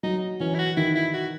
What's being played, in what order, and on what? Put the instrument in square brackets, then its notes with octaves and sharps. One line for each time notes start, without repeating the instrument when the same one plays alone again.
[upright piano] F#3 [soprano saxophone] D#4
[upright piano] E3 [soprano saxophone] C#4
[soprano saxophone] E4
F#4
[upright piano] D#3 [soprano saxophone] E4
[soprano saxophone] E4
F#4